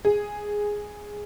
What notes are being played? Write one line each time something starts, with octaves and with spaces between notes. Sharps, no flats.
G#4